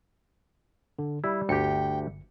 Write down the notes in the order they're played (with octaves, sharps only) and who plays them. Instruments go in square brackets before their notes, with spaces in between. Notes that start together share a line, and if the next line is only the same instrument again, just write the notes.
[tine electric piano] D3
[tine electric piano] G3 [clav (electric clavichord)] E4
[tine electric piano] G1 C#7 [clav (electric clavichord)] D2 G4 [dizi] G5